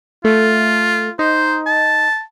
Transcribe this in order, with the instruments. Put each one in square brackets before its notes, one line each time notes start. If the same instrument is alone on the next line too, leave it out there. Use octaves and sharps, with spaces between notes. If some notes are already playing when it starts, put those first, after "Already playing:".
[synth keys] A3 [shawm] F4
[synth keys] D#4 [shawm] C5
[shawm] A5